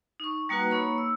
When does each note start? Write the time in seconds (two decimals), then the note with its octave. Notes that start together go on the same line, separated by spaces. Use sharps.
0.20 D#4 C#6
0.49 G3 A#3 D#4 F#4 B4 F#5
0.70 A#3 D#4 C#5 B5 C#6
0.98 E6